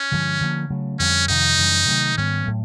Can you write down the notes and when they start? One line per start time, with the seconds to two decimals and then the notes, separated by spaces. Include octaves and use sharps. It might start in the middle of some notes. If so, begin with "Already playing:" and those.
Already playing: C#4
0.11 G2 D3 F3 G#3
0.41 D3 F3 A#3
0.70 C#3 F#3 A3
0.99 F2 D3 G3 C4 C#4
1.28 F2 C3 D#3 D#4
1.58 F#2 C#3 E3 G3
1.88 C3 D#3 F#3 A3
2.17 G#2 D#3 G3 B3 C#4
2.46 A2 F#3 A3